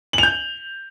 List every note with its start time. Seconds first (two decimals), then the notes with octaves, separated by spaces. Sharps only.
0.13 F#7
0.18 F7
0.23 G6